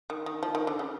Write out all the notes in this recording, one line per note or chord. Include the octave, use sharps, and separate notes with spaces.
D#3
D#3
F3
D#3
D3
C#3